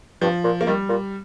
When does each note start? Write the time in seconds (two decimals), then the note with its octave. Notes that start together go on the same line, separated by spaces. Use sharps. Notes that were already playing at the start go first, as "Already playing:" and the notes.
0.21 G2 F3
0.44 A#2
0.61 A#3
0.67 D#3 G3
0.89 A#2